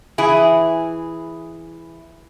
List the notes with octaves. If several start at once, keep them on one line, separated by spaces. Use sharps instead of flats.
E3 E4 G#4